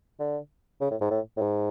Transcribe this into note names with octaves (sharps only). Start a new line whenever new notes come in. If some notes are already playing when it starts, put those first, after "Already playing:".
D3
C#3
A2
G#2
A2
A2
G#2